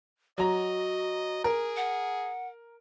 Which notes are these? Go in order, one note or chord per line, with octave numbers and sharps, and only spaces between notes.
F#3 F#4 D#5 A#5
G#4 A#4
F#5